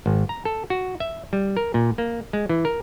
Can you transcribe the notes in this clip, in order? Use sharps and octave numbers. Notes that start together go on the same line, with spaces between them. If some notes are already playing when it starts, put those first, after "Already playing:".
G#1
A#5
A4
F#4
E5
G3
A#4
A#2
A#3
G#3
E3
A#4